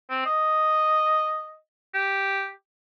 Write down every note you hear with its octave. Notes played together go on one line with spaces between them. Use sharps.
C4
D#5
G4